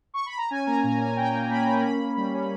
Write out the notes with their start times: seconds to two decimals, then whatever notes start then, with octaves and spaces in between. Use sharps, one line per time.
0.14 C#6
0.26 B5
0.37 A#5
0.50 C#4 G#5
0.67 A#3 A#5
0.83 A#2 G#5
1.00 A#3 G#5
1.16 A#2 G5
1.34 A#3
1.50 A#3 B5
1.67 C#4
1.83 A#3 B5
2.00 C#4
2.17 G3
2.34 C#4